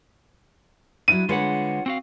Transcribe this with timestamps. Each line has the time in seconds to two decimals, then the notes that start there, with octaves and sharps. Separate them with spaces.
1.08 F#3 D4 E4 D#7
1.29 D3 G#3 F4 B4 C#5 F#5
1.86 C4 F#4 F5